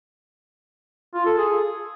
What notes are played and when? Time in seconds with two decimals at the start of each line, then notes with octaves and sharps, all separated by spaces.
1.14 F4
1.26 A4
1.38 G#4